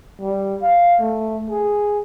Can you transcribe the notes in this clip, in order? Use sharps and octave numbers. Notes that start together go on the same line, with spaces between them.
G3
F5
A3
G#4